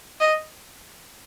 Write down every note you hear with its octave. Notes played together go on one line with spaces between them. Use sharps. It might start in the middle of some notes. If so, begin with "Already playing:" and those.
D#5